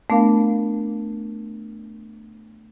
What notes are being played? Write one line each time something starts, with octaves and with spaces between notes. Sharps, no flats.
A3 B3 D4 A#4 F5